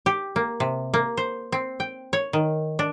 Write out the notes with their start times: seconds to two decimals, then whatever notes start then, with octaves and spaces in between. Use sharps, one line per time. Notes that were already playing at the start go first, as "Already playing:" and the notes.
0.06 G4
0.36 A#3
0.60 C3
0.94 A#3
1.17 C5
1.52 C4
1.80 G5
2.13 C#5
2.33 D#3
2.79 D4